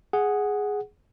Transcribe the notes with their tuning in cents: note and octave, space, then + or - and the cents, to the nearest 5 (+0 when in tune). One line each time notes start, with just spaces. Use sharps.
G#4 +0 F#5 +0